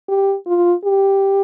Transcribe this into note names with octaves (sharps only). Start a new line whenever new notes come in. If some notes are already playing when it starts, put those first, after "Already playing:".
G4
F4
G4